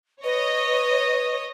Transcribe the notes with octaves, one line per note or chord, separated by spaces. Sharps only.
B4 C#5 D#5